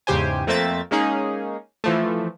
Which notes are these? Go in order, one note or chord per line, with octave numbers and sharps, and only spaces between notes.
E2 G#2 C#3 G4 C5 G#5
F2 A3 A#3 C4 E5 A6
G#3 A#3 C#4 D#4 G#4
E3 F3 A3